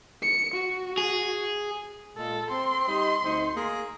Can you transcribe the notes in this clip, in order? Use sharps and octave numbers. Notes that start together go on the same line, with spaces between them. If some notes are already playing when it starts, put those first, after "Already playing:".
C#7
F#4
G#4
A#2 G#3 A4
C4 C6
G3 D#4 D#5
D2 C4 D#4
A#3 G#4